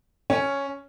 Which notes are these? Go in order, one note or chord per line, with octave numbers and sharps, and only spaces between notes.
C#4